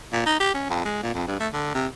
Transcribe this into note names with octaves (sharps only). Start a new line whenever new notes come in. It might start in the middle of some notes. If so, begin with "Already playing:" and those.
A#2
D#4
G4
C#4
F2
G#3
A#2
F2
G2
A3
D3
C3